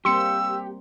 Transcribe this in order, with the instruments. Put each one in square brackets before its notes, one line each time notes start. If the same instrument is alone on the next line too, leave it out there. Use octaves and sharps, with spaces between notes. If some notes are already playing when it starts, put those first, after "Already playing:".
[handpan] G3 A#3 C4 [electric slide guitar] G4 [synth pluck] C6 C#7 [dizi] E6